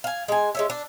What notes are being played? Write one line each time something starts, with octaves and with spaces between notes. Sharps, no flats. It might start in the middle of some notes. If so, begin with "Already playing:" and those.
F5 G#5
G#3 G#5
G#3 C#4 E5
D4